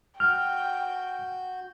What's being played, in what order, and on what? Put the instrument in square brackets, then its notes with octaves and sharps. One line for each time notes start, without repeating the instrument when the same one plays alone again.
[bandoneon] F#4 G6 [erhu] G5 [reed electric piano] F6